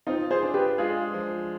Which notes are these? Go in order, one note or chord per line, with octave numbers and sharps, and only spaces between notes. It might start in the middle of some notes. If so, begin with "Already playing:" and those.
C4 D#4 F4
G#4 C5
D4
G4 B4
G#3 F4 G#4
F3